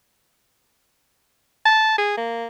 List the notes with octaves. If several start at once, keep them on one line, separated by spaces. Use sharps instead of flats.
A5
G#4
A#3